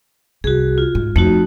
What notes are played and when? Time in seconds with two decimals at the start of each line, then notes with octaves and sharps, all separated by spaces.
0.44 C2 F#4 G#4
0.78 F4
0.95 G#2
1.16 F2 A3 D#4 F#4